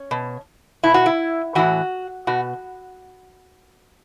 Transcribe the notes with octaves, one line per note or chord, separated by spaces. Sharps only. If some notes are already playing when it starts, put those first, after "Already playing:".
Already playing: C#4
B2
B2 E4
F#4
E4
A2 E3 F#4
B2 F#4